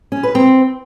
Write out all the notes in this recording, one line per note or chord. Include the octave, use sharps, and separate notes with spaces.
C#4
B4
C4